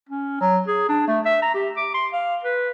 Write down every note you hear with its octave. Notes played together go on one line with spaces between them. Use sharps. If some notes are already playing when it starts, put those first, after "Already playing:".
C#4
F#3
G#4
D4
A3
E5
A#5
G4
D6
C6
F5
B4